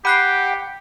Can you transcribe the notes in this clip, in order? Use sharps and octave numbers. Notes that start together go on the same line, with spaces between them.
G4 F#5 G5 B5 F#6 C7